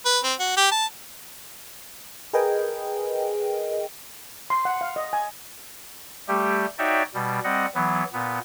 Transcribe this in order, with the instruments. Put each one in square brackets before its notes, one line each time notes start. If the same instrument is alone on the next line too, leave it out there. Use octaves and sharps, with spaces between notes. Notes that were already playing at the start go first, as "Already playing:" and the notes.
[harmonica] B4
C4
F#4
G4
A5
[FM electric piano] G#4 A#4 B4 D#5 G5 G#5
[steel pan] C6
F#5
F5
D#5
G#5
[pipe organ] G3 A3 G4
D#4 F#4 C#5 D5 E5 G5
B2 G3
G3 C4 D#5 F#5
E3 F#3 B3
A#2 B3